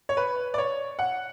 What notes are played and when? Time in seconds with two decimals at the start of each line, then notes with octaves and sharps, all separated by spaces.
0.09 C#5
0.17 B4
0.54 D5
0.58 C#5
0.99 F#5